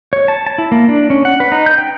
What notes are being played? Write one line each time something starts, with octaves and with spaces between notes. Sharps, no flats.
C#5
A5
A5
E4
A#3
D4
C#4
F#5
B4
D#4
G6
G5